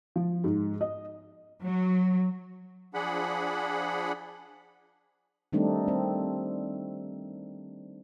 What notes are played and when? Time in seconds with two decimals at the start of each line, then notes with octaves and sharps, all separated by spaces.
0.16 F3
0.44 G#2
0.81 D#5
1.62 F#3
2.94 F3 D4 G#4 F#5 B5
5.53 D#3 G3 A3 C4 D4 D#4
5.88 C4